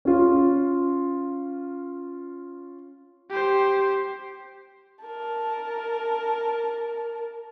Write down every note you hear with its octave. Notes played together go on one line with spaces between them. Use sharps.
C#4 F4
G4 C5
A#4 A5